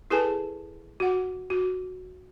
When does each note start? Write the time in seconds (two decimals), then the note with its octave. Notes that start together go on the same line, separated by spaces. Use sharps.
0.10 E4 G#4 A4 B4 G#5 A5
1.00 F#4 F#5
1.50 F#4